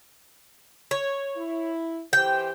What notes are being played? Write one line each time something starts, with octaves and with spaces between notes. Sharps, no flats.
C#5
E4
E3 G4 C5 G5